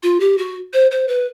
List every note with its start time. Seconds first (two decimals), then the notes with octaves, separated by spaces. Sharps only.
0.03 F4
0.20 G4
0.38 F#4
0.73 C5
0.91 C5
1.08 B4